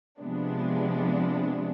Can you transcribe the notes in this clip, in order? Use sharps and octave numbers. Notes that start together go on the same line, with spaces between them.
C3 F3 G#3 B3 D4